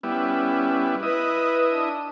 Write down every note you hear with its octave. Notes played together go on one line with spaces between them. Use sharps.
G3 B3 C#4 E4
E4 B4 D#5
D4